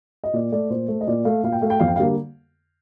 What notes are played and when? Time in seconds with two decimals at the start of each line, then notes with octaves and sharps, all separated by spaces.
0.24 D#5
0.33 A#2 D5
0.52 A3 D5
0.70 A#2 C5
0.88 A3
1.01 D#5
1.07 A#2 D5
1.25 A3 F5
1.43 A#2 F5
1.52 G5
1.61 A3 F5
1.70 G5
1.79 F2 F5
1.88 G5
1.96 F5
1.99 D3 G3 A#3